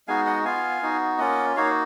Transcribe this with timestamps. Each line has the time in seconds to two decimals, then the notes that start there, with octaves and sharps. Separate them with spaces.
0.08 G#3 B3 D#4 F#4 F5 G#5
0.26 D#5 F#5
0.44 B3 F4 F5 G#5
0.82 B3 D#4 F#4
1.18 A#3 C#4 F4 D#5 F#5
1.57 A#3 D#4 F#4 C#5 F5